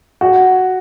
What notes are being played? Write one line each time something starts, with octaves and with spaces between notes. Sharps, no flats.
F#4